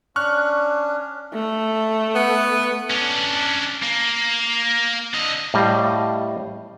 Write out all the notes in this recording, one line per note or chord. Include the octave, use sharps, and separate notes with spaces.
C#4 D4 C#6 F6 F#6
A3
B3
C#4 D4
A#3
D3 D#5
A2 G3 D#5 F5